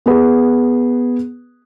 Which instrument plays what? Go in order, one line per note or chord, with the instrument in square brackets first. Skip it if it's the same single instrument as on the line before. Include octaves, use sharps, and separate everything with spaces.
[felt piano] B3 G#4 B4